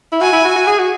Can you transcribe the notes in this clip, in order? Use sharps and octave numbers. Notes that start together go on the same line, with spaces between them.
E4
F#4 G#5
E4
F#4
F#4
G#4
F#4